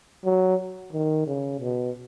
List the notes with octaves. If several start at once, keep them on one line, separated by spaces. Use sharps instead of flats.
F#3
D#3
C#3
B2